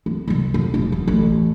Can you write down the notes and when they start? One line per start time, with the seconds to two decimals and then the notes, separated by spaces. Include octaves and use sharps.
0.06 C4
0.28 C2 C3
0.54 F2
0.74 E1 E2
0.92 E2
1.07 A1